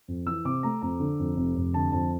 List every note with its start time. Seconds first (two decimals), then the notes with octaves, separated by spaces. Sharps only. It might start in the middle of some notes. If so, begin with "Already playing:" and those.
0.08 F2
0.26 E3 E6
0.45 C3 D6
0.63 A3 A#5
0.82 F2 A#5
1.00 D3
1.19 F2
1.37 F1
1.56 F1
1.74 D3 A5
1.92 F2 A5